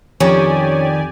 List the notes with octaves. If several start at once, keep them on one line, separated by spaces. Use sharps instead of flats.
F2 D#3 C#4 G4 D5 G#5